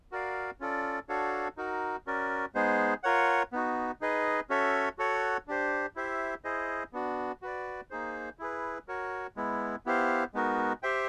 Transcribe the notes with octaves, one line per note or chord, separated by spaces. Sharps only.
F#4 A#4 D5 F5
C#4 F4 A4 D5
D4 F#4 A4 C#5 F5
D#4 F#4 A#4
C#4 F#4 A#4 D5
G#3 B3 D#4 G#4 C5
F4 A#4 C#5 F#5
B3 D#4 F#4
D#4 G#4 B4 D#5
C#4 F#4 A4 C#5 E5
F#4 A4 C#5 F#5
D4 G4 C5
E4 G4 C5 E5
E4 G#4 C5 D#5
B3 D4 F#4
F#4 B4 D5
A#3 D#4 G#4 C5
E4 G#4 B4
F#4 A#4 C#5
G#3 B3 E4
B3 E4 G4 C5 F5
G#3 B3 D#4 F#4 A#4
G4 C5 E5 G5